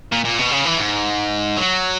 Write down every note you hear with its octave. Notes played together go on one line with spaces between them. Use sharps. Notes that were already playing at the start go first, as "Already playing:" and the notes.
A#2
A#2
B2
C#3
E3
G#2
F#3